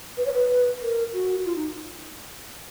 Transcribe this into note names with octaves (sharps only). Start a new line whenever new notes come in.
B4
C#5
B4
A#4
F#4
F4
D#4